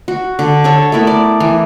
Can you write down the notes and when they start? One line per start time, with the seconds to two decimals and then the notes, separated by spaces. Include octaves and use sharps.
0.08 F#4
0.39 D3
0.64 A4 C#5 A5
0.92 A3 B3 E4 A#4
1.07 D5
1.40 E3